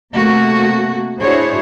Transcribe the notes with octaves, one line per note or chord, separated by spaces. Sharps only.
C3 A3 A#3 F#4
D4 E4 F#4 G#4 C5 C#5